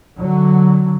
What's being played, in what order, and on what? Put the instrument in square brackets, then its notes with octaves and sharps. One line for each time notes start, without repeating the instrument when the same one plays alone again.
[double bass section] D3 F#3